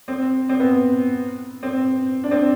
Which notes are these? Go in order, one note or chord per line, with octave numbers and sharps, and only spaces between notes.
C4
C4
B3
C4
D4
C4